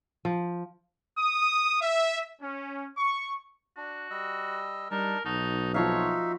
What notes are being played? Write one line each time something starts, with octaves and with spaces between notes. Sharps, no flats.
F3
D#6
E5
C#4
C#6
D4 F#4
G3 D#5 E6
G3 D4 D#4 A#4 A5
B1 D#4 F#4 A5
F3 D#4 F#4 C#5 E5 F5